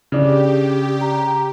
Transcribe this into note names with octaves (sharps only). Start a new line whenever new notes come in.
C#3 D4 G4
A#5